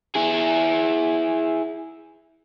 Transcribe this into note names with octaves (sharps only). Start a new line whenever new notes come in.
E4 G#4